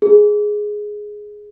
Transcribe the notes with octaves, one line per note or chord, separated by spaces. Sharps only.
G#4